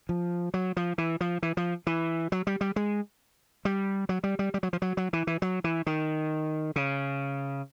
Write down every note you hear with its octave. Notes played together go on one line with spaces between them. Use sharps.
F3
F#3
F3
E3
F3
E3
F3
E3
F#3
G3
G3
G#3
G3
F#3
G3
G3
G3
F#3
F3
F#3
F#3
E3
E3
F#3
E3
D#3
C#3